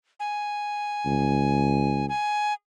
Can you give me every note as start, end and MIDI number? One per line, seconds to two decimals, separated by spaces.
0.20 2.06 80
1.05 2.07 37
2.09 2.53 80